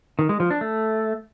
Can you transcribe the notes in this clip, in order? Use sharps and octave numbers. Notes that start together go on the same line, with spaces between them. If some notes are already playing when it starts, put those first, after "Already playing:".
D#3
G#3
F3
D4
A3